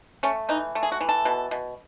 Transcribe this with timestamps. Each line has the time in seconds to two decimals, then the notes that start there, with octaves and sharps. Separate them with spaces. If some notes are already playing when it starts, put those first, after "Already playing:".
0.23 A3 C#4
0.49 E3 D#4
0.75 A3
0.83 G#4
0.92 F#4
1.01 E3
1.09 A4
1.25 B2
1.51 B2